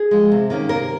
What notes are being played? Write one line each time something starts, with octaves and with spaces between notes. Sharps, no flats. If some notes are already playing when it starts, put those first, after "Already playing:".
Already playing: G#4
F3 G#3
C3
D#3 A#3 C#4
C3 A#4